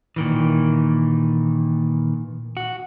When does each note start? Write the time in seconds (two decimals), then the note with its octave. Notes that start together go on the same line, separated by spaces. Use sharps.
0.16 A#2 D#3 E3
2.57 F#4